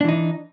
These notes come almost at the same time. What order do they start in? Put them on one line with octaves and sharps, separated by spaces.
D4 E3 D#4